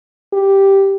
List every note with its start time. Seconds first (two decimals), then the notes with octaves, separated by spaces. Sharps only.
0.33 G4